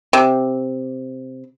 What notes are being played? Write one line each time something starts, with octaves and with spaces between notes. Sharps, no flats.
C3